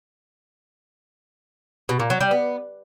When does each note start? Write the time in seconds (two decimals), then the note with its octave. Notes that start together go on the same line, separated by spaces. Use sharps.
1.89 B2
2.00 A#2
2.10 F#3
2.21 G3
2.31 B3